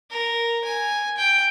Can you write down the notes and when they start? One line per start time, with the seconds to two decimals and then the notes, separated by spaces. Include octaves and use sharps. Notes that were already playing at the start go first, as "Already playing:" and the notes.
0.11 A#4
0.65 G#5
1.17 G5